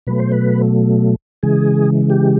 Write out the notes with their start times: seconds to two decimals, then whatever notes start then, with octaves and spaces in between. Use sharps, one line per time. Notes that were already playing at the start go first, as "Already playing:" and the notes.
0.07 B2 F#3 A3 B4
0.19 C5
0.32 B4
1.43 C#3 E3 G#3 G#4
2.10 G4